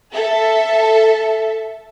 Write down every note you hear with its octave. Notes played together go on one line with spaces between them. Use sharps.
A4 E5